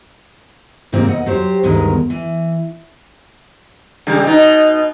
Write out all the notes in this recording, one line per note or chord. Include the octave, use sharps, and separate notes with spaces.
G#2 C3 G3 A#3 C4
D#2 D#5 F#5
F#3 G4 C5
D2 G2 B2 D#3 G#3 A#4
E3
C#3 G3
B2 D#4